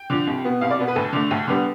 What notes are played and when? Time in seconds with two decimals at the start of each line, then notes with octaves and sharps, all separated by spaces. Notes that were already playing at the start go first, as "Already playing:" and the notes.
Already playing: G5
0.10 D3 F3
0.27 C2
0.44 B2 B3
0.61 C2 F5
0.71 D5
0.79 B2 B3
0.88 B4
0.95 D2 A4
1.13 D3 A3
1.31 D2
1.47 D3 G3 B3